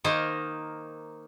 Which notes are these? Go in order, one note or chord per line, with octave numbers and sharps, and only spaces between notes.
D#3 A#3 D#4 C5